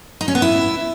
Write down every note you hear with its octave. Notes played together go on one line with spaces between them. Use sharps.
D#4
C#4
B3
E4